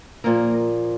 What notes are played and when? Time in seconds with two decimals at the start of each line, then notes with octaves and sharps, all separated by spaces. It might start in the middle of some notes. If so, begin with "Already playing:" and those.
0.24 A#2 F3 A#3 A#4